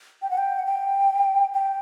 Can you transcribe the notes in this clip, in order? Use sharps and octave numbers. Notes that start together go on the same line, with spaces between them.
G5
F#5
G5
F#5
G5
G5